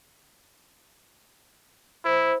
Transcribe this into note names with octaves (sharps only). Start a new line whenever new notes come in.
E4 C5